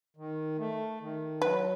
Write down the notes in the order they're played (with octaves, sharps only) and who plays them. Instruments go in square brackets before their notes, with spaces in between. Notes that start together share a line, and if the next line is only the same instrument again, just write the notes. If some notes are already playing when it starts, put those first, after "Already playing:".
[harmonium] D#3
A3
D#3
[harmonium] F#3 [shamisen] B4